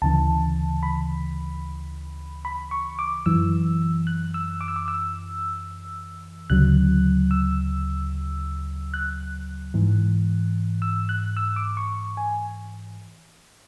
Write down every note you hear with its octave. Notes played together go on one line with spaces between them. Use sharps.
D2 C#3 E3 A5
B5
B5
C#6
D6
F#2 E3 E6
F#6
E6
D6
E6
D6
E6
D2 C#3 F#3 F#6
E6
F#6
G#2 E3
E6
F#6
E6
D6
C#6
G#5